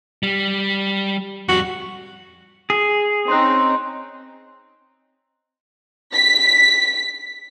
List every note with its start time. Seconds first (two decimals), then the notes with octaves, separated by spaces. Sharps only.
0.23 G3
1.49 F2 G3 F#4
2.70 G#4
3.28 C4 C#4 D#4 C6 F#6
6.14 B6